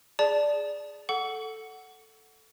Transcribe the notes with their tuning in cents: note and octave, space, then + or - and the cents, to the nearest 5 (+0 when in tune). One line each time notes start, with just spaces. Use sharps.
G#4 +0 D5 +0 A5 +0
A4 +0 F#5 +5 C#6 +40